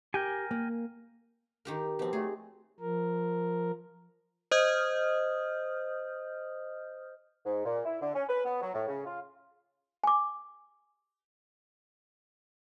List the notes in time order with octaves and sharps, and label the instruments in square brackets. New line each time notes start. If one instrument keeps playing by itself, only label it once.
[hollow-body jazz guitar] G4 [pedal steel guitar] A#4 G5 G#5
[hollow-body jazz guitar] A#3
[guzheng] D#3 G4 A#4
[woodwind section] B2 F3 [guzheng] C4 G4
[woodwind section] F#3 A3 [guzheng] G#4
[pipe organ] F3 A#4
[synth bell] C5 D#5 D#6 F6 G6
[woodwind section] G#2
A#2
E4
D3
C#4
B4
B3
F#3
A2
C#3
F4
[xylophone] G#5 D6